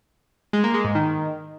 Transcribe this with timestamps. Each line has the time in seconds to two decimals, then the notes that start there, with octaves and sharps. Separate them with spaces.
0.53 G#3
0.64 A#3
0.74 G#3
0.84 G#2
0.95 D#3